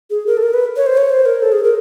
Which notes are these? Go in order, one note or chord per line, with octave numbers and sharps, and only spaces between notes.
G#4
A#4
A4
A#4
B4
C#5
C5
C#5
C5
A#4
A4
G#4
A#4